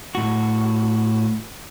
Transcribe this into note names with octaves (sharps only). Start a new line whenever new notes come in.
A2 F#4